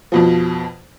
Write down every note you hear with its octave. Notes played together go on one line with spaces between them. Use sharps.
F2 B2 F3